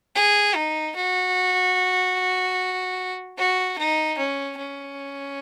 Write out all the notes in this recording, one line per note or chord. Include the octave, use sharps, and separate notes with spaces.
G#4
D#4
F#4
F#4
D#4
C#4
C#4